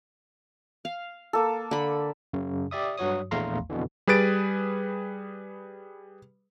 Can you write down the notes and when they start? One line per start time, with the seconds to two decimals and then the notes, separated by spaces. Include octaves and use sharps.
0.85 F5
1.33 A#3 A4
1.71 D3 B5
2.33 F#2 C#3
2.71 G4 D5 E5 D#6
2.98 G2 F#3 F#4 C#5 D#6
3.31 A#1 E2 A3 F5 A#5 C6
3.70 F2 B2 D3 E3
4.07 G3 G#4 B4 A6 D7